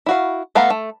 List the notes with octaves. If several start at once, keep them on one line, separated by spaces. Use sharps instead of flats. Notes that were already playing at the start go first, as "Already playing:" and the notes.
E4 F#4 F5
A3 B3 F5 F#5 A#5
A3